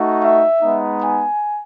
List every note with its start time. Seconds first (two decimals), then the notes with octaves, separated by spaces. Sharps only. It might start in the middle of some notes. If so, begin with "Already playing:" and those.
Already playing: A3 D#4 F#4
0.22 E5
0.62 G#3 B3 D#4
1.03 G#5